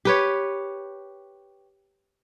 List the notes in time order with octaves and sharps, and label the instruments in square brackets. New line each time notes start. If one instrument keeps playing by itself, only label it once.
[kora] G4 B4 C#5